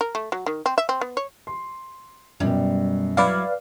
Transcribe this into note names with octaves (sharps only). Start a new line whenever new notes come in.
A#4
A3
F#3
D#3
C4
E5
C4
B3
C#5
C6
F#2 B2 G3
F#3 E4 B4 D5 F5